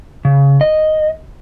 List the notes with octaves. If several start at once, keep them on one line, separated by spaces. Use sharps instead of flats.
C#3
D#5